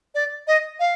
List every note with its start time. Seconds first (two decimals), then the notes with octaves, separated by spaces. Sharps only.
0.15 D5
0.47 D#5
0.80 F5